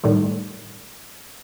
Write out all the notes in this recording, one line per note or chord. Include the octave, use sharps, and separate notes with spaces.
A2 D#3 G3 A3